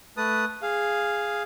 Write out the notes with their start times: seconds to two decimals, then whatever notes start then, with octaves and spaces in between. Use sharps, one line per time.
0.17 A3 B4 A5 D#6
0.62 G#4 F5